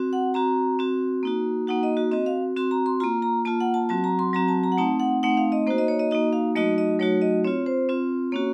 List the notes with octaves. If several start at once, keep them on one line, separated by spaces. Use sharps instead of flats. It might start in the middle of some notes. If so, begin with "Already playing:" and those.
Already playing: C4 F#4
F#5
C4 F#4 A#5
C4 F#4
A#3 D#4 F#4
A#3 D#4 F#4 F#5
D#5
F#4
C4 F#4 D#5
F5
C4 F#4 C6
A#5
C6
A#3 F4 A#5
A#5
A#3 F4 A5
F#5
A5
F#3 C4 F#4 A5
A#5
C6
F#3 C4 F#4 A#5
A5
A#5
F#5
A3 C4 D#4 A5
F#5
A3 C4 D#4 F#5
F5
D#5
A#3 D#4 F#4 C5
D#5
C#5
D#5
A#3 D#4 F#4 D#5
F5
F#3 A3 D#4 F#4 D#5
D#5
F#3 A3 D#4 F#4 C#5
D#5
C4 F4 C#5
C5
C4 F4
A#3 C#4 F#4 C#5